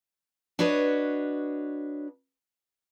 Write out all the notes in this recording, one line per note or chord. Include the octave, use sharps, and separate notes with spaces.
D4 F#4 B4 C#5 D#5